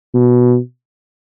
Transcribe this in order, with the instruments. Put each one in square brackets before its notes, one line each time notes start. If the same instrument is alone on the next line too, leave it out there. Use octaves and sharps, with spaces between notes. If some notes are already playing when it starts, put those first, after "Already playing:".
[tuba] B2